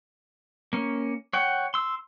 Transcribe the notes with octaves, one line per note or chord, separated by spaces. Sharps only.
A#3 C#4
C#5 F#5 G5
C6 E6